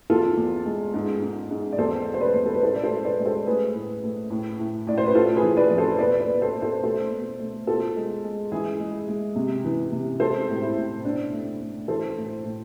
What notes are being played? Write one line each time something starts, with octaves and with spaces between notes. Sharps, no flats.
E2 F4 A4
E2
G#3
G#2
G#2
G#2
D5
E2 A4 C5
G#3
C5
B4 D5
E2
A4
B4
A2 A4 C5
D5
A4 C5
G#3
B4 D5
G#3
A4 C5
A3 G#4 B4
A2
A3
A2
A2
A2 D5
C5
B4
A3 F4 A4
G#4 B4
E3
B4 D5
F2
A4 C5
B2 B4 D5
B4 D5
B2
A4 C5
B2
A4 C5
A3 A4 C5
B2
A3
B2 F4 A4
G#3
G#3
E3 E4 G#4
G#3
G#3
C3
E3
C3
G#3 A4 C5
A2
E4
A2
B2 D4
A3
A3
E3 A4 C5
A2
A2